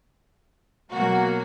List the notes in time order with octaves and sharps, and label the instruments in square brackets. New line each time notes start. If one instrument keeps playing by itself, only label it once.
[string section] B2 F#3 A#3 F#4